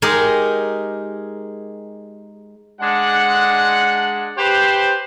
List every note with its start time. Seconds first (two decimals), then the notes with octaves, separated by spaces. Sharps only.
0.02 G#3 D#4 G4 G#4 A#4
2.81 G#3 D4 F#5
4.38 G4 B4 C5